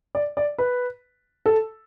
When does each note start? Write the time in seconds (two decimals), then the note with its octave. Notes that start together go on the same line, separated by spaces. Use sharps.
0.15 D5
0.37 D5
0.58 B4
1.46 A4